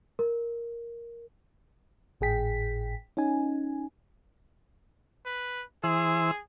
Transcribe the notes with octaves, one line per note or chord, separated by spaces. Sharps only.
A#4
G#1 A2 G#4 G5 B6
C#4 D#4 G#5
B4
E3 G#4 C5 E6